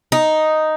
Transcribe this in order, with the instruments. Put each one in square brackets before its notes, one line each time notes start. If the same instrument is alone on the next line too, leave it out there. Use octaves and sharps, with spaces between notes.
[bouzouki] D#4